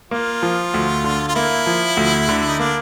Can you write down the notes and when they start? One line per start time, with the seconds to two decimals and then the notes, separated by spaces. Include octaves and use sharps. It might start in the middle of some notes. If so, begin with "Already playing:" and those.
0.11 A#3 F4
0.42 F3
0.74 D2
1.04 D3
1.28 F4
1.35 A#3 E4
1.67 F3
1.97 D2
2.29 D3
2.48 D#4
2.59 A#3 D4